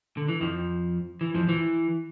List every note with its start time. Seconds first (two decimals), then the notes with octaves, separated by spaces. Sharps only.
0.17 D3
0.28 E3
0.41 F2 F3
1.21 E3
1.35 F2 F3
1.49 E3